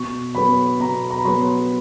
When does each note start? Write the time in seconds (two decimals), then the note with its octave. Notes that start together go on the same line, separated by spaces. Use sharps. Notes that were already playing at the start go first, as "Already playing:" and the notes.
Already playing: B2 C#6
0.35 F#3 B3 B5
0.80 B2 A#5
1.10 A#5
1.18 B5
1.25 F#3 B3 C6